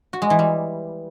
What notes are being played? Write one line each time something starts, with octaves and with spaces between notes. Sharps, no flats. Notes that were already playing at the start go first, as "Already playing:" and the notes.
F#4
G#3
E3
G3